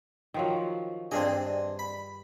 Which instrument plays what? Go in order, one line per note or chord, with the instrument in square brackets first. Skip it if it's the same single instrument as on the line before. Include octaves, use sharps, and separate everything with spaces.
[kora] D#3 F3 F#3
[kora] G2 G#4 D#5 [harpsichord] C4 D4 G#5
[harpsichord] B5